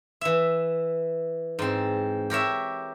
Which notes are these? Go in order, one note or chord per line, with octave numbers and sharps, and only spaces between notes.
E3 E5
G#2 C4
G4 A#4 C#5 E5